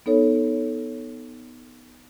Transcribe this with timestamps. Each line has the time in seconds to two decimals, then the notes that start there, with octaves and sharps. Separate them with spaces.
0.06 B3 D#4 A4 C#5